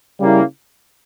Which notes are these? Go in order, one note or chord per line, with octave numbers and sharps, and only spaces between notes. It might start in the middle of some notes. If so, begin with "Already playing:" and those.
C#3 G3 A#3 E4